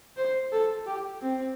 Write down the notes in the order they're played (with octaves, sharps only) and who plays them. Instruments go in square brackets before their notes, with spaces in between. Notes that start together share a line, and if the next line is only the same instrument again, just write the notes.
[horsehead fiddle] C5
A4
G4
C4